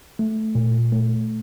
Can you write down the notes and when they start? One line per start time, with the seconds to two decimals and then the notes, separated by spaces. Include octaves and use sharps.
0.19 A3
0.55 A#2
0.92 A3